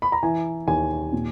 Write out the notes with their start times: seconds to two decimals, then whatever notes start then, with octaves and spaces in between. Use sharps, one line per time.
0.02 B5
0.12 A#5
0.23 E3 G#5
0.67 D#2 G#5
1.13 A#2